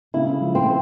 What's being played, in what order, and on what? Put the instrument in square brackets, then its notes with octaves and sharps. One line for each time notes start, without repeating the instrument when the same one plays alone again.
[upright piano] C#3 [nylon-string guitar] E4
[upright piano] F3
[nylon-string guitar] C4